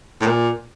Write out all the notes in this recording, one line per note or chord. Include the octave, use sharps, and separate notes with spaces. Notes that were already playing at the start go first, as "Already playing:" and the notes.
A2
A#2